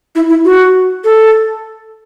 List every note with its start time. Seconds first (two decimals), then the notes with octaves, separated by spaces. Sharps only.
0.15 E4
0.30 E4
0.44 F#4
1.04 A4